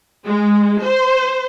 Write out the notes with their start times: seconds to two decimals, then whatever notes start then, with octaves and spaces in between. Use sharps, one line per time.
0.25 G#3
0.83 C5